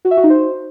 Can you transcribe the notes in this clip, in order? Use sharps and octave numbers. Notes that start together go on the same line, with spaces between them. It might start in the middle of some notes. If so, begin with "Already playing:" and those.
F#4
E5
F#4
D#4
C5